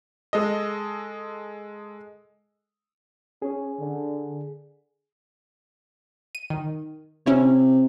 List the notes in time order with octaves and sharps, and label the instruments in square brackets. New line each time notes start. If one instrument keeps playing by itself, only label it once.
[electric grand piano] G#3 A4 D#5
[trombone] C#4 [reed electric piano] G#4
[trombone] D3
[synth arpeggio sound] D#7
D#3
[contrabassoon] C3 [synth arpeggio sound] C#4 E4 C#5